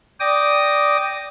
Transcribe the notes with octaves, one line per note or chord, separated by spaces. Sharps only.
D5 G5 D6 D#6 A#6